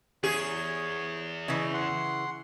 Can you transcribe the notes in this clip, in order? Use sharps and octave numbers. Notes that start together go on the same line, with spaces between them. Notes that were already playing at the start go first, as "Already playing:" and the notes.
E2 G#4 C#5
C#3 E3 D#5
F#5 C6